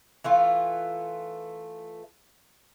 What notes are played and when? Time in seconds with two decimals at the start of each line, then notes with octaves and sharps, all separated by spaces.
0.24 E3 A3 F4